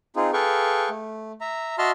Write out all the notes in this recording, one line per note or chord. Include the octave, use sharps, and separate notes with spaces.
C4 D#4 F4 G#4
G#4 A4 B4 F5 G5 C#6
A3
E5 A#5
F#4 D#5 E5 A5 C6 F6